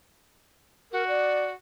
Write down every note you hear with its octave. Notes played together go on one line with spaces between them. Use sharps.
F#4 A#4
D5